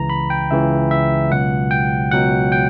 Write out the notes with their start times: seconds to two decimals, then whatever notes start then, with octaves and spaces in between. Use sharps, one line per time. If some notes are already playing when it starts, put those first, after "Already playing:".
Already playing: C#2 C#3 E3 A#5
0.10 B5
0.30 G5
0.51 C#2 C#3 E3 E5
0.91 E5
1.31 C#2 B2 F#3 F#5
1.71 G5
2.11 C#2 B2 F#3 F#5
2.52 G5